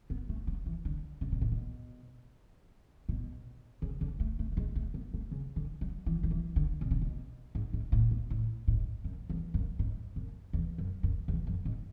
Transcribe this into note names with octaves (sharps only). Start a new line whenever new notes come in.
B3
A3
F#3
E3
D3
C#3
B2
A2
B2
B2
C#3
D3
A3
A3
A3
G#3
A3
B3
A3
C#3
D3
F#3
E3
D3
E3
D3
B2
C#3
B2
G#2
G#2
A2
B2
A2
G#2
F#2
E2
F#2
G#2
F#2
E2
F#2
F#2
E2
F#2
G#2